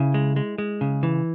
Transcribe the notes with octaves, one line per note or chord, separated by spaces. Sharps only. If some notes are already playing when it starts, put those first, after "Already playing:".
Already playing: C#3 E4
G#3
G#3
G#3
C#3
E3